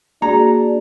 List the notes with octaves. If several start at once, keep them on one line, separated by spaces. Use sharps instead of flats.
A#3 D4 F#4 G#4 A#5